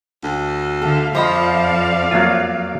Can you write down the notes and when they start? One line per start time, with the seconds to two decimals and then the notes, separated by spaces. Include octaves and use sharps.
0.23 D2
0.82 D3 A4 E5 F5
1.15 F2 F3 C5 D5 D#5 F5 B5
2.11 F#3 A#3 F4